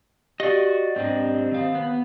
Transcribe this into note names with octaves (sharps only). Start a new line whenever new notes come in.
F#4 G4 D5 D#5
G#2 C4 D4
D#3 F5
B3